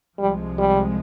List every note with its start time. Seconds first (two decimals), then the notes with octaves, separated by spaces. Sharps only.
0.18 C2 C3 F3 G3 G#3
0.58 G3